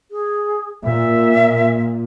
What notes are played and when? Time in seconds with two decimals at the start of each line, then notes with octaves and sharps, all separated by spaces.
0.11 G#4
0.84 A#2 E5